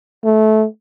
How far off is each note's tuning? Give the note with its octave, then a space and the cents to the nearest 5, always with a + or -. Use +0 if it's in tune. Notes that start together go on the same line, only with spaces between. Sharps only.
A3 -20